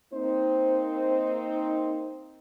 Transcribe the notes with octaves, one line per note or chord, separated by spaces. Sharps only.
A#3 C4 D#4 C5